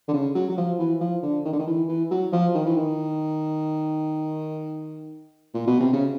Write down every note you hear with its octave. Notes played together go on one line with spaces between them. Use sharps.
D3
C#3
F#3
F#3
F3
E3
F3
D3
D#3
D3
D#3
E3
E3
F#3
F3
D#3
E3
D#3
A#2
B2
C3
C#3